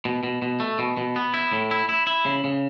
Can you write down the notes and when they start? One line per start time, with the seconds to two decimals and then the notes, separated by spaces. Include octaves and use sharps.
0.05 B2
0.23 B2
0.42 B2
0.60 A3
0.79 B2
0.97 B2
1.16 B3
1.34 E4
1.53 A2
1.71 E4
1.89 E4
2.07 E4
2.25 C#3
2.44 C#3